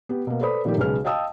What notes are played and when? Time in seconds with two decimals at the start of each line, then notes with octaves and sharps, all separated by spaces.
0.09 B3 G4
0.27 B2 A#3
0.41 A4 B4 C5 D5 B5 D#6
0.65 A#2 D#3 F3 A3 G4 A#4
0.77 B1 C#3 G#3 B4 F6
1.05 D#5 F5 G5 A5 D#6 E6